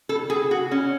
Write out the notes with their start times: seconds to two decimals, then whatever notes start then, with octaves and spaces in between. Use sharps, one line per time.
0.09 A4
0.30 G#4
0.51 F#4
0.71 C#4